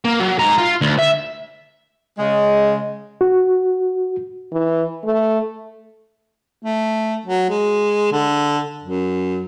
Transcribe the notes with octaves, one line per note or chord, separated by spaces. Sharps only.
A#3
F#3
G#2 A#5
F4
D2
E5
C#3 G#3
F#4
E3
A3
A3
F#3
G#3
D3
F#2